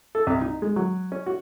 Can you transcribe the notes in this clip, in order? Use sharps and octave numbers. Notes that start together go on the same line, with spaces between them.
A4
C2
D#4
G#3
F#3
C#4
F#4